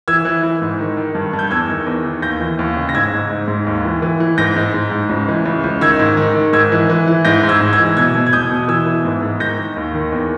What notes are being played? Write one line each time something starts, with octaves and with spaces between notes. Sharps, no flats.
E3 E6 G#6
E3
E3
G#2
D#3
D#3
G2
G2
G6
E2 E6 G#6
D#3
E2
D#3
D#2 G6 A#6
E3
D#2
C#3
A#6
G#2 E6 G#6
G#2
G#2
G#2
D#2
E3
E3
E3
G#2 G6 A#6
G#2
G#2
G#2
C#2
E3
C#2
C#2
D#3 E6 G#6
G#2
D#3
D#3
G#2 E6 G#6
E3
E3
E3
G#2 G6 A#6
G#2
E6 G#6
G#2
E6 G#6
E3
B2 E6 G#6
B2
G#6
E2 D#6 G6
B2
E3 E6 G#6
E3
G#2
G#2
D#3 G6 A#6
D#3
D#2
D#3
E2